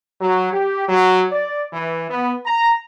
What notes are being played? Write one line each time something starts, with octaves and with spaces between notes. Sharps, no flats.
F#3
G4
F#3
D5
E3
B3
A#5